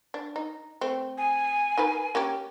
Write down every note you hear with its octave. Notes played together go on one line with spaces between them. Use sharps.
D4
D#4
A3 C4
G#5
D#4 A#4 B4
A#3 C#4 G4